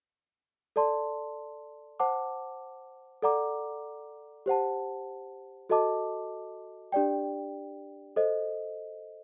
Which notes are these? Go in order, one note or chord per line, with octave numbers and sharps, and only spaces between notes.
A4 D5 A5 C6
C5 F#5 A5 D6
A4 D5 F#5 A#5 D6
G4 C5 F#5 A5
F#4 A4 D#5 A5 D6
D4 G4 D5 G5
A4 C5 D#5